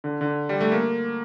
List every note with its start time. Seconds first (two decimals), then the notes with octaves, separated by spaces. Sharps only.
0.04 D3
0.21 D3
0.49 G3
0.61 A3
0.72 A#3